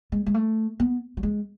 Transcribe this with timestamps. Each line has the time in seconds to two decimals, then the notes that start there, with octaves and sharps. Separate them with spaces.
0.12 G#3
0.26 G#3
0.34 A3
0.80 B3
1.17 F#3
1.23 G#3